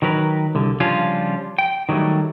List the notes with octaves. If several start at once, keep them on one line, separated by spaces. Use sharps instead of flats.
D#3 F#3 A#4 B4
C2 D3
C#3 F3 G3 C#4 D4 F4
G5
D#3 F#3 G3 A3